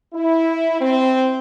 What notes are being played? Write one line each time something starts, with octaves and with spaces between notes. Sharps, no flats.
E4
C4